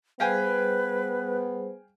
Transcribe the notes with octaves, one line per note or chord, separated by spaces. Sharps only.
G3 B3 G#4 B4 C5 F5 G5 G#5